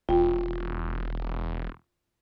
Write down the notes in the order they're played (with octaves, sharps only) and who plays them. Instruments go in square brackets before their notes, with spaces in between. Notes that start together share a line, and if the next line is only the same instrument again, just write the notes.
[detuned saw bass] E1 [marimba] F4 G5